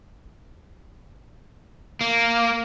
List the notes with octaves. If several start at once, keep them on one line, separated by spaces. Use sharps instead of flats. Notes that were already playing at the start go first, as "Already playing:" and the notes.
A#3